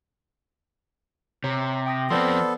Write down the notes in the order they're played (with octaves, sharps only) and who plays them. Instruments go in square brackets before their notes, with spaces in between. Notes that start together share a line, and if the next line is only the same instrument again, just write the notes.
[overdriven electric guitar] C3 [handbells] C#5 A#5
[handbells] G5 D#6 A#6
[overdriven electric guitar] F3 C4 [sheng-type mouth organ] B3 A4 [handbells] C5 D5 C6